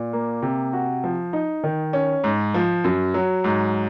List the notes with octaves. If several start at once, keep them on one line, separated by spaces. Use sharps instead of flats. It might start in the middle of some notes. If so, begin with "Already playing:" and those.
Already playing: A#2
A#3
C3
F#4
F3
D#4
D#3
C#4
G#2
F3
F#2
F#3
G#2